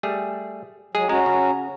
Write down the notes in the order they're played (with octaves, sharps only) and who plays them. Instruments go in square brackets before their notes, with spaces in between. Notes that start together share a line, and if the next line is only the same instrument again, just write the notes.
[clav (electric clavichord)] G3 A3 G#4
[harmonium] F#3 [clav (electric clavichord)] G#3 G#4
[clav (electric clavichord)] G#3 [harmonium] C#4 F#4 A#5
[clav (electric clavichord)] C#3